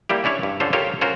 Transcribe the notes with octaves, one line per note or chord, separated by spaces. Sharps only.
G3 A#3 E4 G4
C#4 D4 E4 C#5
G2
D3 C#4 F4 A4 C5
F4 G4 A4 A#4 C#5
C#4 F4 F#4 A#4 C5